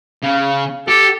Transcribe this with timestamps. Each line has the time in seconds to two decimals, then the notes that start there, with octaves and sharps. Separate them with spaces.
0.23 C#3
0.88 G4 A4